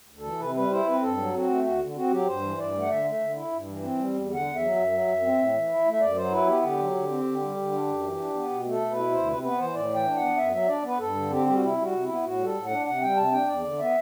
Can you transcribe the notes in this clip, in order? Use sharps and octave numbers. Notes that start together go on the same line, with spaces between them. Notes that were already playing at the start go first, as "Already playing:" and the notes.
D2
E3 A4
C3 B4
G3 B4
E4 C5
C4 B4
G2 A4
F#3
C4 F#4
A3
D2 F#4
D3
C4 F#4
F#3 G4
G2 C5
E3
G2 D5
A3
F#5
D3 E5
A3
E5
D3
E4
G2
E3
C4
G3
E2
D3
F#5
E2
E5
F#3
F#2
F#3
F#2
C4
A2
E3
E4
A3
E5
F#2 D5
F#3 C5
E4 B4
B3 G4
D3 G4
F#3
D3
C4
D3
G3
D3
D4
F#2
E3
D4
B3
B2
A3
A4
B2
B4
E4
D2 C5
C3 B4
B3 B4
E3 C5
A2 D5
E3 G5
D4
B3 F#5
F#2 E5
F#3 E5
D4 D5
B3 B4
G2 A4
D3
C4 G4
G3 G4
F#4
C3 E4
G3
F#4
C3
E4
B3
A2 F#4
G3
A4
A2
F#5
D4
C3 F#5
G3 G5
C3 A5
D4 G5
E2 D5
D3
B3 E5